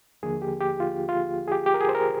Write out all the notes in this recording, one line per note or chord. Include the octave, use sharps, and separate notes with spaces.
D#2 D3 F3 A#3 G#4
G4
G4
F4
F4
G#4
G4
G4
A#4
G#4
C5
A#4